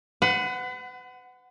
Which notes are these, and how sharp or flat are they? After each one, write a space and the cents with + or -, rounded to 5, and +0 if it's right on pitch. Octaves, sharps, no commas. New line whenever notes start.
B4 +40 F#5 +0